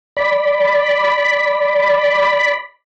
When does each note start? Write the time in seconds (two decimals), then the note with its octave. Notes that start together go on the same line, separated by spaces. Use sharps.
0.17 D5 B5